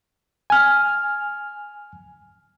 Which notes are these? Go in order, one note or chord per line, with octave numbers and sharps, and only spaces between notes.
G#5 F6